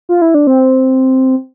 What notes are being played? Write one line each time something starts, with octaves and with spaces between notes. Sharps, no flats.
F4
E4
D4
C4